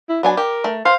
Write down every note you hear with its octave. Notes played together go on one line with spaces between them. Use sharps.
E4
F#3 B3 D4 G#5
G4 A#4
A3
C5 F5